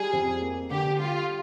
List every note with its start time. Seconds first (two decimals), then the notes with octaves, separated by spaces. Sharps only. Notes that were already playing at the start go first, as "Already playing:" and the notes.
Already playing: G3 G#4
0.13 F2
0.42 A#3
0.71 D3 G4
0.99 G3 F4